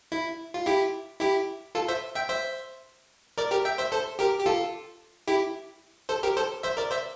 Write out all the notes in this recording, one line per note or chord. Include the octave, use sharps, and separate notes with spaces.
E4
F4
E4 G4
E4 G4
F4 A4
C5 E5
E5 G5
C5 E5
A#4 D5
G4 A#4
E5 G5
C5 E5
A4 C5
G4 A#4
G4
F4 A4
E4 G4
A4 C5
G4 A#4
A4 C5
C5 E5
A#4 D5
C5 E5